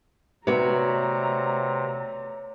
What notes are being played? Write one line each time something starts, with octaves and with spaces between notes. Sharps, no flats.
C3 A3 B3 F#4 C#5 D5 A#5